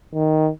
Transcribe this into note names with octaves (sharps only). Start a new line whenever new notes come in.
D#3